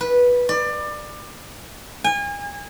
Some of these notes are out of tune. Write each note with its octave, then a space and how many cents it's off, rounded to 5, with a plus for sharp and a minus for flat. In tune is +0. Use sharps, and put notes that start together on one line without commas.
B4 -10
D5 +25
G#5 -35